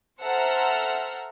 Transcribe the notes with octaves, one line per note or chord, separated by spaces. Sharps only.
A4 C5 E5 F#5 A#5 F6